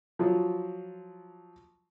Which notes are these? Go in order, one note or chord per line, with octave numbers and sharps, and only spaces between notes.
F3 F#3 F4